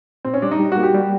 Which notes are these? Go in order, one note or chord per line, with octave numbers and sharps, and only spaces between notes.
A#2 C4
C#4
G3 D4
D#4
G3
F#4
A#3
G4
G3